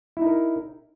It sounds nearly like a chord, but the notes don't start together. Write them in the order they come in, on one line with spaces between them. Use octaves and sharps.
E4 D#4 A#4